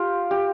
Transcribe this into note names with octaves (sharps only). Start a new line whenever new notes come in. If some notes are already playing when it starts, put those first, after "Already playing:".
Already playing: F4 G4
G4